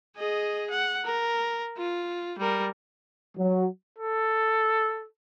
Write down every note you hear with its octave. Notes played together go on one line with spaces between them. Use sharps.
G#4 D#5
F#5
A#4
F4
G3 A#4
F#3
A4